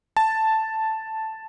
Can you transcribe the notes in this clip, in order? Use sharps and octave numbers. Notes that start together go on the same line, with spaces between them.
A5